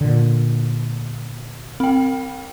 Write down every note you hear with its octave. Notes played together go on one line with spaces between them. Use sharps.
A#2 D3
C4 G5